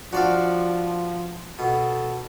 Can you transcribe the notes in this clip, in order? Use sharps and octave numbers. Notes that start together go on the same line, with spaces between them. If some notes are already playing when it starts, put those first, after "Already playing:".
F3 D4 F#4 D5 F5
B2 A4